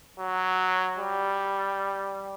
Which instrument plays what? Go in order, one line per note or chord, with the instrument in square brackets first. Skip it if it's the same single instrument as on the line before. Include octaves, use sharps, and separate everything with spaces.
[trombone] F#3
G3